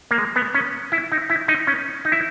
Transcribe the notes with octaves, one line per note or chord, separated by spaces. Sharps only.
A#3
G#3
B3
C#4
E4
D#4
E4
D#4
C#4
D#4
E4